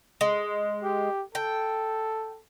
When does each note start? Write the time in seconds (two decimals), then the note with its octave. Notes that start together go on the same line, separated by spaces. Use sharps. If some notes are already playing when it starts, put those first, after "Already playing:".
0.21 G#3
0.83 G4
1.35 A4 G5